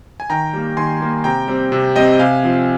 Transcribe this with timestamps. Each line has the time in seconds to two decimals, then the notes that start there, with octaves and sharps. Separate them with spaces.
0.20 G#5
0.30 D#3 G5 A#5
0.53 G3 A#3
0.77 D#3 G#5 C6
1.00 G3 A#3
1.24 C3 G5 A#5
1.48 G3 C4
1.72 C3
1.96 G3 C4 D#5 G5
2.19 C3 F5 G#5
2.43 F3 C4